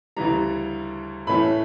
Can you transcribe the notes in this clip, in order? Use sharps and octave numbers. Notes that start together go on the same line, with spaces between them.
D2 C#3 E3 G3 A#5
A2 E3 A3 C#4 B5